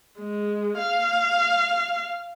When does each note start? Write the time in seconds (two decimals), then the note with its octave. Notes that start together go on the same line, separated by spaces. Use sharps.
0.19 G#3
0.78 F5